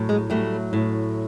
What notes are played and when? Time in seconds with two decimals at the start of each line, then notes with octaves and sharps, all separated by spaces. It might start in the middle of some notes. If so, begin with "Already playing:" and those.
Already playing: A2 F#3
0.09 G#3
0.30 F#3 G3 A3
0.73 A2